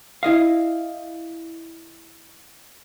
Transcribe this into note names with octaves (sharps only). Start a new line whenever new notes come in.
E4 D#5 F5